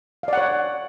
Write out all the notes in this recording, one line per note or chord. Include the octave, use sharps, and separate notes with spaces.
C#5 D5 F5 F#5